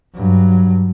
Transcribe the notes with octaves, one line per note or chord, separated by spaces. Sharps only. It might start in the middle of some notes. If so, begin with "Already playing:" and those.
G2 F#3